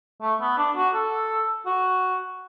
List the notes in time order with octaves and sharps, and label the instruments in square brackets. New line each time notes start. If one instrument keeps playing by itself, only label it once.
[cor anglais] A3
B3
D4
F#4
A4
F#4